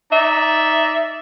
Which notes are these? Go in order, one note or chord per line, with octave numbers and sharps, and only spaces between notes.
D#4 D5 E5